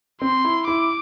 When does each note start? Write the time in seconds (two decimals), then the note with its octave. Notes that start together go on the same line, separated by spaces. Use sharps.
0.22 C4 C6
0.45 E4
0.67 E4 D6